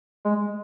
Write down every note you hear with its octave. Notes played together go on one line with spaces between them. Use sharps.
G#3